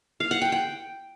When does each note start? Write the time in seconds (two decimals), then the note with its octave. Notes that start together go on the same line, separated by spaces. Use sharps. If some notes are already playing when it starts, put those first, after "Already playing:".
0.20 F5
0.31 F#5
0.42 G5
0.52 G5